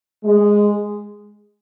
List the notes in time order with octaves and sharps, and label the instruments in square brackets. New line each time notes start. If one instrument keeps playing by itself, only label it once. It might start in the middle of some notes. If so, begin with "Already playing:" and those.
[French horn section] G#3